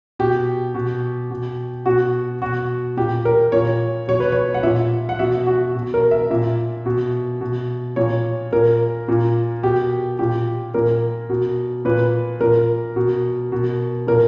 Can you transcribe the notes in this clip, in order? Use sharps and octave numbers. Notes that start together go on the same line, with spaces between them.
B2 G4
B2
B2
B2 F#4
B2 F#4
A#2 G4
A#4
A#2 C#5
B2 C#5
B4
C#5
F#5
A#2 E5
F#5
B2 E5
F#4
B2
A#4
E5
A#2 E5
B2
B2
A#2 C#5
A#2 A#4
A#2
B2 G4
A#2 G4
A#2 A#4
B2
A#2 B4
A#2 A#4
B2
B2
A#2 A#4